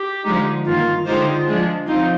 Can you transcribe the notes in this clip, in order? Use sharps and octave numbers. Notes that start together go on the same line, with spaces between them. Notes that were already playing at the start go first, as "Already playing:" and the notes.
Already playing: G4
D3 F3 G#3 D#4
G2 D#3 A#3 F4
D3 G#3 D#4 F4 G4 C5
F3 G#3 D4
F3 C4 D#4 F4